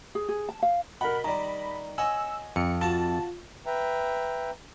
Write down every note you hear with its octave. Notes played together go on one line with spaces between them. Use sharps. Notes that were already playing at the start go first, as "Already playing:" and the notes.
G#4
G#4
A5
F5
B2 A#4 F#5 B5
D#3 G3 D5 A#5
C#5 D#5 F#5 G#5 E6
F2 C#7
F4 F#4 A5 E7
B4 E5 G5 A#5